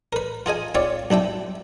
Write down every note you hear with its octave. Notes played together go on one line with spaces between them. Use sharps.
A#4 B4
F4 G#4 D#5 G#5
C4 F4 C#5 D5
B1 D4 E4 G5